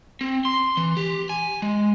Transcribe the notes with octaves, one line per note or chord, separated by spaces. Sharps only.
C4
C6
E3
G4
G#5
G#3